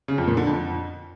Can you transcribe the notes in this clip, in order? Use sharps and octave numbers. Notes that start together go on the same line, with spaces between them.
C#3
F2
A#2
D3
F2